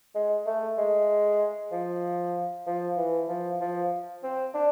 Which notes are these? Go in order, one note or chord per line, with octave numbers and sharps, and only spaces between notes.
G#3
A3
G#3
F3
F3
E3
F3
F3
C4
D4